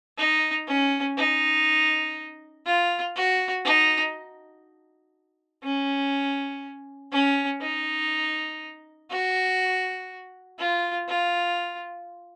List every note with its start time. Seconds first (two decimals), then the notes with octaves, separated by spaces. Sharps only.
0.18 D#4
0.67 C#4
1.17 D#4
2.66 F4
3.16 F#4
3.65 D#4
5.63 C#4
7.12 C#4
7.62 D#4
9.11 F#4
10.59 F4
11.08 F4